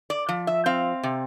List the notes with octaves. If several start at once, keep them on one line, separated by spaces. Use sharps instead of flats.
D5
F3
E5
C4 F5
C3